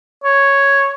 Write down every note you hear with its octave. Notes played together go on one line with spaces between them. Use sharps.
C#5